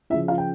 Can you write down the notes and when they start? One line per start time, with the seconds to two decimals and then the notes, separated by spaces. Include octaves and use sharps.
0.10 C#3 F3 E4 E5
0.28 F4 F5
0.38 G5